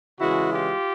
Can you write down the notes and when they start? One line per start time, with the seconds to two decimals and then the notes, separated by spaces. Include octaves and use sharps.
0.20 C#3 E3 G#3 E4 F#4
0.51 F4 G4